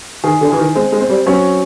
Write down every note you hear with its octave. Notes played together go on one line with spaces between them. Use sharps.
D#3 G#4
D3
E3 G#4
D#3
G#3 C4
G#3
C4
G3
F#3 C#4